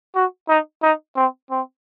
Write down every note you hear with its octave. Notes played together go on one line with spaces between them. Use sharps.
F#4
D#4
D#4
C4
C4